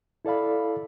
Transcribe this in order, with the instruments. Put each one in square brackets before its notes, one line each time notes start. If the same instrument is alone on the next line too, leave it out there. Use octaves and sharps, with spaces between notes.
[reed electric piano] E4 A4 D5 F5 B5